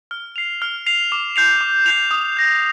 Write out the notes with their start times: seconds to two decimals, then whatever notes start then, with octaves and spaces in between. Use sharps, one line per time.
0.11 F6
0.36 C7 F7
0.62 F6
0.86 C7 F7
1.12 D6
1.36 G6 C7 F7
1.61 D6
1.86 G6 C7 F7
2.11 D#6
2.37 G6 A#6